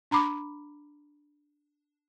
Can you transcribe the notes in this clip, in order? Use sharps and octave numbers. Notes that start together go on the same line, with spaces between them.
D4 A#5 B5 D6